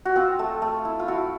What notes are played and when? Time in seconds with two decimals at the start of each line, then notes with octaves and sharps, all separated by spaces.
0.05 F#4
0.16 C4 F4
0.39 A3
0.62 A3
0.85 E4
0.99 F4
1.08 E4 F#4